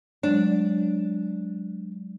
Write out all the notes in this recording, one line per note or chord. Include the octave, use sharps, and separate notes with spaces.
F#3 G#3 D4 C#5